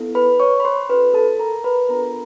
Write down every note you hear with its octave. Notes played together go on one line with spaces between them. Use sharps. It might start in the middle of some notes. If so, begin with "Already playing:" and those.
Already playing: B3 E4 A4
B4 B5
C#5 C#6
B5
C5 C6
C#4 F#4 A4 B4 B5
A4 A5
A#4 A#5
B4 B5
B3 D4 F4 A4 A#4 A#5